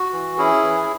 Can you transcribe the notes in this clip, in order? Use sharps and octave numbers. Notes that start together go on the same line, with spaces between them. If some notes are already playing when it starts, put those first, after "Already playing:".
Already playing: F#4
E3
C#4 E4 G#4
E3